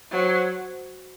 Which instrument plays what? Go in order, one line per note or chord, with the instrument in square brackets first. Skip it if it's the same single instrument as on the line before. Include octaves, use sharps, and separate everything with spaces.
[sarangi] F#3 [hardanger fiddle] C5